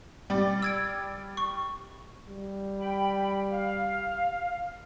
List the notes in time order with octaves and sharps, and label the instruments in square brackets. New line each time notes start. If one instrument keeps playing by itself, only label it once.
[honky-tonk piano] G3 D5
[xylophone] E6 G#6 D7
C#6
[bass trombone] G3
[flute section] G5 B5
F5